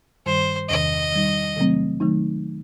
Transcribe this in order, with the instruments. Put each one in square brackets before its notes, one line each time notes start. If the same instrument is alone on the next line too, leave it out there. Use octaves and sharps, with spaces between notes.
[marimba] G2 D#3 G3 [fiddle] C5
[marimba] E2 C3 D#3 [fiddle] D#5
[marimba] D#3 G3 D#4
C3 D#3 F#3 A3 C4
D#3 F#3 A3 D#4